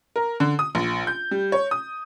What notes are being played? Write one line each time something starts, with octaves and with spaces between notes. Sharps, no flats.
A#4
D3
D#6
A#1
G6
G3
C#5
D#6